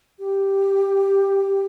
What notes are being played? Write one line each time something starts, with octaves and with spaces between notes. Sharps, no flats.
G4